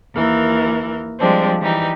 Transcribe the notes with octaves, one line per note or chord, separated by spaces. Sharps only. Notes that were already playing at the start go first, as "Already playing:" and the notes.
D#2 E3 A#4
F3 G3 G#3 C4 D4
E3 G3 D#4